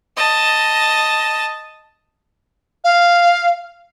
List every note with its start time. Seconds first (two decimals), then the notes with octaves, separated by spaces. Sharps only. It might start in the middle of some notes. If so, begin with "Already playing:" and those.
0.17 D#5 A5
2.84 F5